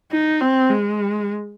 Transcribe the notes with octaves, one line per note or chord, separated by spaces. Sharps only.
D#4
C4
G#3